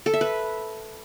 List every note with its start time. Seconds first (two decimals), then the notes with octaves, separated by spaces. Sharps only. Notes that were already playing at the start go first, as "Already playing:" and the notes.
0.06 A4
0.13 E5
0.21 B4